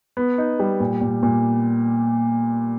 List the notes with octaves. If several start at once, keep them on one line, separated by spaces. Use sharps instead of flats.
B3
D#4
G3
A#2
A#2
A#2